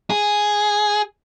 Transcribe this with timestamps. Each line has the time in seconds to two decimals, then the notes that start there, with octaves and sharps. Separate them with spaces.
0.10 G#4